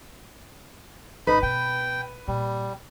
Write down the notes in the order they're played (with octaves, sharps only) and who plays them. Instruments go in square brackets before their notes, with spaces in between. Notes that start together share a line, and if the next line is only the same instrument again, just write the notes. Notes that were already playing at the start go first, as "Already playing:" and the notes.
[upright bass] G1 [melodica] D#4 B5 [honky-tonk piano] B4
[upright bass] B2 [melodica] G5
[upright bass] A#2 [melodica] G3